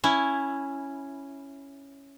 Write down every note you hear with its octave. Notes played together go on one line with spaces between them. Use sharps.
C#4 E4